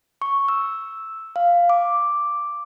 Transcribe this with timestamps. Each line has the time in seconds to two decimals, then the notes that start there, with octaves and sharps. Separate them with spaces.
0.22 C#6
0.48 E6
1.36 F5
1.70 D6